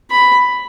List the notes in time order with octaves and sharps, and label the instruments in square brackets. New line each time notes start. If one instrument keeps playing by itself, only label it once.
[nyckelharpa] B5